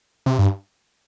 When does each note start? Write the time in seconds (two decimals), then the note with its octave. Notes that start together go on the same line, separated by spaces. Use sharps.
0.26 C3
0.38 G2